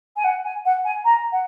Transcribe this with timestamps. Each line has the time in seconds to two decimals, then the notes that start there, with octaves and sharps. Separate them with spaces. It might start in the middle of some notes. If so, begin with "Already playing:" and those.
0.17 G#5
0.24 F#5
0.45 G#5
0.65 F#5
0.85 G#5
1.05 A#5
1.32 F#5